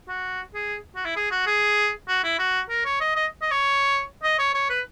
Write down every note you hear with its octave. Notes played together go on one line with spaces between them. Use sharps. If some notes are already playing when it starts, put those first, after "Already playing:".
F#4
G#4
F#4
E4
G#4
F#4
G#4
F#4
E4
F#4
A#4
C#5
D#5
D#5
D#5
C#5
D#5
C#5
C#5
B4